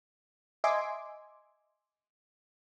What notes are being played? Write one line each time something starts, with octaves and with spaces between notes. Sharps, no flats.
D#5 E5 G#5 C6 D6